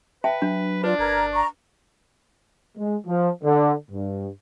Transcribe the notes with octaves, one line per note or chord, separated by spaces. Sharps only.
B4 E5 G5 A5
F#3 D4
D4 F4 B4 D5
G1 A#4 A#5 G#6
A#5 C#6
G#3
F3
D3
G2